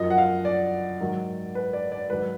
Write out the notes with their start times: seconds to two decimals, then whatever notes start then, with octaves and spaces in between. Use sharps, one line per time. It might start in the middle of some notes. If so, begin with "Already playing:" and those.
Already playing: F#2 F3 D#5
0.10 F#5
0.18 F5
0.45 D5
1.00 G#2 D#3 F#3
1.55 B4
1.73 D5
1.92 D5
2.10 G#2 D#3 F#3 B4